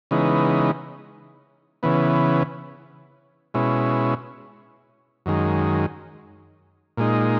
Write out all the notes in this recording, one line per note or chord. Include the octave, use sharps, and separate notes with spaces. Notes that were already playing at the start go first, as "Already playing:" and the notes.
C#3 E3 G#3 B3 D#4
C#3 E3 B3
B2 G#3 C#4 E4
F#2 D#3 G#3
A#2 G#3 D#4